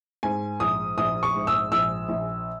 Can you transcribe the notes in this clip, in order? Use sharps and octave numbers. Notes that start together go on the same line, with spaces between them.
G#2 G#5
A#1 D#6
A#1 D#6
C#6
G#2
E6
A#1 E6
A#1